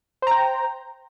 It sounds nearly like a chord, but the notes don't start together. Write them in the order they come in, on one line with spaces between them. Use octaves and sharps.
C5 A#5 G5